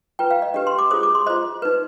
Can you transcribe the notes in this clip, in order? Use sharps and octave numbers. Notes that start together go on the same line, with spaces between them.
F4 B4 G5
F5
D#5
D4 G4 B4 D#5
C6
D6
F4 G#4 C5 D#6
D6
C6
F4 C5 D#5
D#4 B4